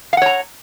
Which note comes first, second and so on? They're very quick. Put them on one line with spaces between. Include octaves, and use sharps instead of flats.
F5 F#5 C#5 A#5